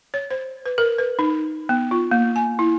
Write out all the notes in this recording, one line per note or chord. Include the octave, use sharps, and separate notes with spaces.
C#5
C5
B4
A#4
B4
D#4
B3
F4
A#3
G#5
E4